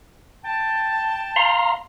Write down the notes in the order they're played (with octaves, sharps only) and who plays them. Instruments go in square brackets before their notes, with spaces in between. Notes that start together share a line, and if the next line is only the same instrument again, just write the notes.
[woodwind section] G5 A5
[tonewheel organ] F5 A#5 C6